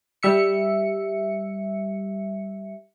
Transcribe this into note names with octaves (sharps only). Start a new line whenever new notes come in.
G3 E5 C#7